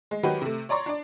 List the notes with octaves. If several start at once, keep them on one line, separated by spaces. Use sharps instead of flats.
G#3
D#3 F#3 D#4 F#4 G4 B4
C3 A3
C#5 D5 A#5 C6 C#6
D4 D5